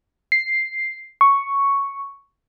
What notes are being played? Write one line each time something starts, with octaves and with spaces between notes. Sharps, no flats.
C7
C#6